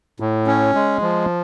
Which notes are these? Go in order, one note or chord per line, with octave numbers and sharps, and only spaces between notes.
A2
C#4
G#3
F3